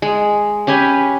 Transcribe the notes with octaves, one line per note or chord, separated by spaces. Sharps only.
G#3
C#4 G4 B4 G#5